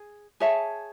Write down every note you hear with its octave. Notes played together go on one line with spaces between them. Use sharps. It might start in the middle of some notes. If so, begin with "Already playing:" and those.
Already playing: G#4
G#4 C#5 E5 A5